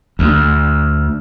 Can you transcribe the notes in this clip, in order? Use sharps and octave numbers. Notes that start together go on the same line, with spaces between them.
D2